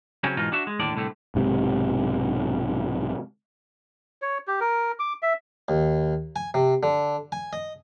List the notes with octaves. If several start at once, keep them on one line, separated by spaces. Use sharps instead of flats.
C#3 F#3 C4 C#4
G#2 B2 E3 D#4 F4
D4 F#4 E5
G#3
D#2 A2 D3 D5
C2 A2 D3 A3
B1 G#2 C3
C#5
G4
A#4
D6
E5
D#2
G#5
C3
D3
G#5
D#5